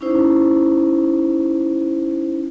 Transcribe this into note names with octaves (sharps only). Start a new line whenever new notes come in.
C#4 D#4 E4 C5